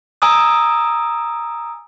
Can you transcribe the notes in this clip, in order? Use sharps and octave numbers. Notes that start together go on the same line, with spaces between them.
G#5 A#5 D#6 E6